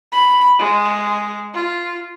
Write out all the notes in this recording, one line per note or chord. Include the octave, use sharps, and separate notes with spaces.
B5
G#3
F4